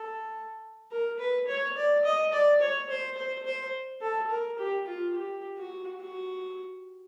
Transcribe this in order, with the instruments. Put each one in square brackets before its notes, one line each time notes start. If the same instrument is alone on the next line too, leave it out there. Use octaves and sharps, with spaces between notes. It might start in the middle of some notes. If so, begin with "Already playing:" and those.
Already playing: [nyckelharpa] A4
A#4
B4
C#5
D5
D#5
D5
C#5
C5
C5
C5
A4
A#4
G4
F4
G4
F#4
F#4